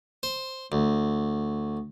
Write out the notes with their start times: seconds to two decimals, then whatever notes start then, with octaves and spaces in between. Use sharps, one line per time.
0.23 C5
0.72 D2